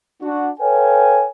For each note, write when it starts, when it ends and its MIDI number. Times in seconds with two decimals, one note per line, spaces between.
0.22 0.49 62
0.22 0.49 66
0.60 1.26 69
0.60 1.26 71
0.60 1.26 73
0.60 1.26 77
0.60 1.26 79
0.60 1.26 80